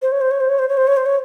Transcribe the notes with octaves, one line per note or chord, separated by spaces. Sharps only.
C5
C#5
C5
C#5
C5
C#5
C5
C#5
C5
C#5
C5
C#5